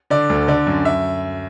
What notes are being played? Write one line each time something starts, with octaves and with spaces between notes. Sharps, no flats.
D3 D5
D2
D3 D5
F#2
E5